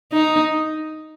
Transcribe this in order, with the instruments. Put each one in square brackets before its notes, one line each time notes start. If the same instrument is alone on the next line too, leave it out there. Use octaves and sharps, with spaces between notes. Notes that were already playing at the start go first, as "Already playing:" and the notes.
[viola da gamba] D#4